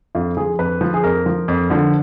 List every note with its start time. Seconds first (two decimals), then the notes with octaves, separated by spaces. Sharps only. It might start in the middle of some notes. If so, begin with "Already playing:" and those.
0.15 F2 F4
0.37 F3 G#4
0.59 F2 B4
0.81 F3
0.94 G#4
1.04 F2 A#4
1.26 F3
1.48 F2
1.70 D3 F3